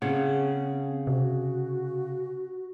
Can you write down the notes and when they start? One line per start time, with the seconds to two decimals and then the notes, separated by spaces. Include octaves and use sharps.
0.02 C#3 C4 G#4 C#5 F#5
1.07 C3 F#4